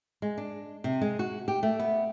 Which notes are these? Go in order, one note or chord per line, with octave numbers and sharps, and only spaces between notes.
G#3
D4
C3
G#3
F#4
G4
A3
B3